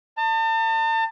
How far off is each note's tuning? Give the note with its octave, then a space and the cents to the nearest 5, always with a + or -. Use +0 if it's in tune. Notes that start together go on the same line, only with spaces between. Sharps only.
D#5 -30 A5 +40